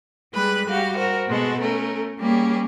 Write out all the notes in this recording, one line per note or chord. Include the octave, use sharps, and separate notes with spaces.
G3 G#3 G#4 B4 B5 F#6
G3 F#4 G4 F5
F#4 A#4 C5
B2 G#3 F#4 A4
A3 C#4 A#4
G3 A#3 C#4 G4 G#4